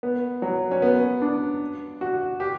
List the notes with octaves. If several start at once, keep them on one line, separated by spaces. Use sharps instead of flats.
B3
F#3
C#4
B3
D4
F#4
G4